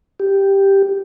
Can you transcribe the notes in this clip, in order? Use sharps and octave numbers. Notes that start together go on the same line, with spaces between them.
G4